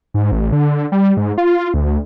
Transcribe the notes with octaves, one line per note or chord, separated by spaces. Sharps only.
G#2
A1
D3
G3
G#2
F4
D2